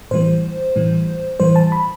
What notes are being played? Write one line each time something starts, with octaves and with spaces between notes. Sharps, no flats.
A2 E3 G3 C5
A2 E3 G3
A2 E3 G3 C5
A5
B5